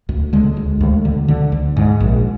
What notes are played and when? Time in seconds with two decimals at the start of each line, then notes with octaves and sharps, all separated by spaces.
0.09 D2
0.33 D3 G#3
0.57 D2
0.81 D2
1.05 D3
1.28 D3
1.52 D2
1.77 G#2
2.00 A#1